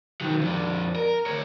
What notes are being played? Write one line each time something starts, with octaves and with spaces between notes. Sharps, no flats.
D#3 F#3
F2 D4
A#4
D2 C#5